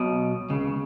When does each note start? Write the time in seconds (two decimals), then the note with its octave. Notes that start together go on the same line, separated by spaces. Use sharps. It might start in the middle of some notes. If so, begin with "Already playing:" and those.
Already playing: B1 B2
0.50 C#2 C#3